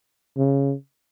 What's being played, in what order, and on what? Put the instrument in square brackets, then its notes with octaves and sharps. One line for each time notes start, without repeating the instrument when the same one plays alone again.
[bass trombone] C#3